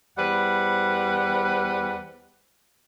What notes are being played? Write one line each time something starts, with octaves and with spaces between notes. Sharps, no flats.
E2 G3 B4 C5 F#5